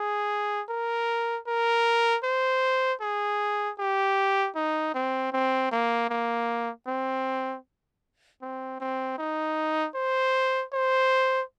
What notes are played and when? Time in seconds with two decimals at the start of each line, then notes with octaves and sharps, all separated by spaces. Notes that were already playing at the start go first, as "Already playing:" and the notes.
Already playing: G#4
0.69 A#4
1.47 A#4
2.24 C5
3.01 G#4
3.79 G4
4.56 D#4
4.95 C4
5.33 C4
5.72 A#3
6.10 A#3
6.87 C4
8.42 C4
8.81 C4
9.18 D#4
9.95 C5
10.73 C5